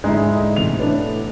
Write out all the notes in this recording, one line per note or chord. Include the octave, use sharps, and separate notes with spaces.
G#2 D3 G#3 D#4 E4
A1 C3 E3 F7
A2 B3 D4